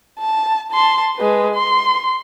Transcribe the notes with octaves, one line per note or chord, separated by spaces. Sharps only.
A5
A5 C6
G#3 B4
C6